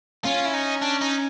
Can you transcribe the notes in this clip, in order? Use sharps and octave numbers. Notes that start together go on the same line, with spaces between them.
C#4 F4
E4
D#4
D4
D#4